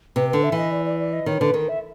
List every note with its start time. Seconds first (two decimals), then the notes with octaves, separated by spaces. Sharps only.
0.16 C3 B4
0.29 D3 B4
0.43 E5
0.52 E3 D#5
0.71 D5
0.85 D5
0.99 D5
1.12 D#5
1.26 D#3 C#5
1.40 D3 B4
1.54 D#3 A#4
1.68 E5